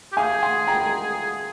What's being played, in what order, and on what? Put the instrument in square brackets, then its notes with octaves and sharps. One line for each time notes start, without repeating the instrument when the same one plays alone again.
[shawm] G4
[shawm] G#4 [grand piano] F5 G#5
[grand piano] G#5 C6
G5 A#5